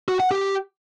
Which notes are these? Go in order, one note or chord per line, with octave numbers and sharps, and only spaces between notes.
F#4
F#5
G4